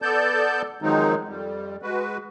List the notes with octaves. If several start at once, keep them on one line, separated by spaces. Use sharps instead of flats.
B3 A4 D5 A5 G6
D#3 F3 F#3 G#3 C4 D#4
F2 G3
G#3 F#4 B4